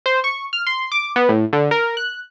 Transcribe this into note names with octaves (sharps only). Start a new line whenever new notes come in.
C5
C#6
F6
C6
D6
B3
A2
D3
A#4
F#6